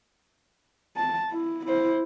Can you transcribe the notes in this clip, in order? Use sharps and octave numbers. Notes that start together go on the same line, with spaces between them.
A5
E4
E4 C5